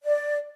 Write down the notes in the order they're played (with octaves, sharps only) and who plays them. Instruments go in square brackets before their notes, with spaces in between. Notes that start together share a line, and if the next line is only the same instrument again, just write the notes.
[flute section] D5